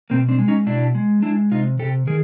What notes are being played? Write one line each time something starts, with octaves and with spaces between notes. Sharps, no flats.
B2 A#3 C4
C4 D4
G#3
C#4 D#4
B2 D4 E4
G#3
G#3 D4 E4
C3 D#4 F4
C3 G4 A4
D#3 G#4 A#4